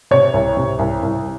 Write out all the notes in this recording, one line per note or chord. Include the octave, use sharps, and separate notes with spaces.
C3 C#5
C2
C3
C2
C2